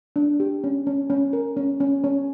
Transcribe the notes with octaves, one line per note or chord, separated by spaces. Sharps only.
D4
G4
C#4
C#4
C#4
A#4
C#4
C#4
C#4